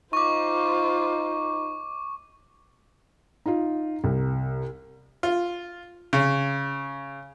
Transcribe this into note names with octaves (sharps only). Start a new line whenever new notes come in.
D#4 F4 C5 C#6 D6
D#4 F4
C2
F4
C#3